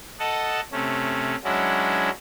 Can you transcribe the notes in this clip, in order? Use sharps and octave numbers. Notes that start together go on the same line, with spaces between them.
A4 D#5 F#5 A5
C3 A3 C#4
F#3 G#3 C#4 D4 E4 F#4